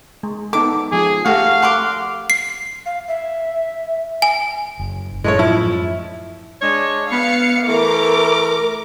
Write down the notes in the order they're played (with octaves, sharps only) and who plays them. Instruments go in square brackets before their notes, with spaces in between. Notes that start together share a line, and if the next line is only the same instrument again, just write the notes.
[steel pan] G#3
[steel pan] B3 D#4 A4 [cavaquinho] D6
[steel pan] F3 G#3 [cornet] G#4
[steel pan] A3 G4 [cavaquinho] F#4 [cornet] F5
[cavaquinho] F#5 C6 D6
[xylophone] C7
[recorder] F5
E5
[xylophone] G#5
[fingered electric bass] F#1
[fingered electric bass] F#2 A2 [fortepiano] G#3 A3 C#5
[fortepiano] F3 E4
[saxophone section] G#3 D4 C#5
[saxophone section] B3 [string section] F5 C#7
[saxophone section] E3 A3 [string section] A#4 D6